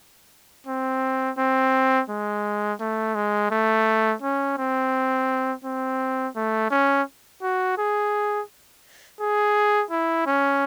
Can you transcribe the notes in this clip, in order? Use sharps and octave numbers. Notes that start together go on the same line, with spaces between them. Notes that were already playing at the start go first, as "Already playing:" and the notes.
C4
C4
G#3
A3
G#3
A3
C#4
C4
C4
A3
C#4
F#4
G#4
G#4
E4
C#4